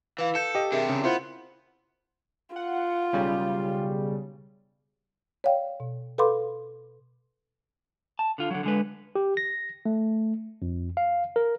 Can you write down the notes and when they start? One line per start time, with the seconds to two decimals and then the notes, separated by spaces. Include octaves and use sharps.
0.19 E3 B4 F5
0.35 A4 G6 C#7
0.55 G4 D#5
0.72 C3 D4 G#4 A#4 E5
0.89 C#3
1.04 B3 E4 F4 C5
2.56 F4 F#5
3.13 B1 C#3 G3
5.44 C#5 D5 F5 G5
5.80 B2
6.18 A4 B4 F5 B5 C6 D6
8.19 A5
8.38 D3 F4
8.51 D3 F#3
8.63 D3 G#3 B4
9.15 G4
9.37 A#6
9.86 A3
10.62 F2
10.97 F5
11.36 A#4